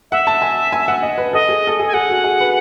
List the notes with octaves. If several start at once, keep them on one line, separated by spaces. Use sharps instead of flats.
E5 F#5
A5
G#5
G#5
F#5
D#5
B4
A4 D#5
G#4
A4
G#4
G#5
G#4 F#5
F#4
G#4
B4